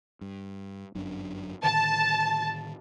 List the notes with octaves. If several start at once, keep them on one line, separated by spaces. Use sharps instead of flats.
G2
G1 F#2 D4
A2 D3 D#3 A5